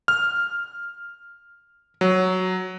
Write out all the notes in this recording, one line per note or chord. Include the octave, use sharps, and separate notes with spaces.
F6
F#3